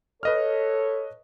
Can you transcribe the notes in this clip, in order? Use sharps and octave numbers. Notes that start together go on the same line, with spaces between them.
A4 B4 C#5 D#5 F6